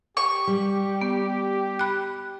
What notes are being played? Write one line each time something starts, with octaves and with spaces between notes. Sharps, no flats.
G4 C#6
G3
B3
B5 F#6